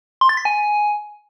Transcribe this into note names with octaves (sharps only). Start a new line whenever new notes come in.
C6
A6
B6
G#5